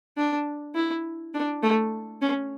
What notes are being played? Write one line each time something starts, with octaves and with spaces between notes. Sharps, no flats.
D4
E4
D4
A3
C#4